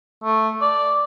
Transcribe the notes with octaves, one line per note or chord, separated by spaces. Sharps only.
A3
D5